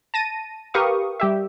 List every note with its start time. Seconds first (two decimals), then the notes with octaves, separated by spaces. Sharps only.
0.14 A5 A#6 D#7
0.74 G4 A#4 B4 F5 C#6 D#6
1.20 G3 G4 E5